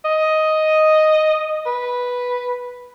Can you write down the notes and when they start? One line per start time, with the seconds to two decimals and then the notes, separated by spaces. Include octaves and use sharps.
0.05 D#5
1.66 B4